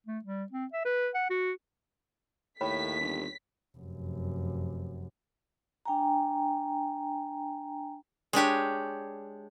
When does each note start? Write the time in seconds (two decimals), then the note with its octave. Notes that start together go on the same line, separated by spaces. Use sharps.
0.07 A3
0.24 G3
0.52 C4
0.73 E5
0.85 B4
1.14 F#5
1.30 F#4
2.61 D#2 A2 C#5 G5 B5 B6
3.00 G1
3.77 F1 F#2
5.86 D4 G5 G#5 A#5
8.33 G#3 D4 G4 C#5